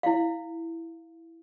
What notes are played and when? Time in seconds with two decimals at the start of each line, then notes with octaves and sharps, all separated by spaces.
0.03 E4 F5